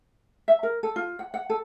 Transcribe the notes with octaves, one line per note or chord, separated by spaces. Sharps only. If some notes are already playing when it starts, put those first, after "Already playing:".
E5
A#4
A4
F4
F#5
F#5
A4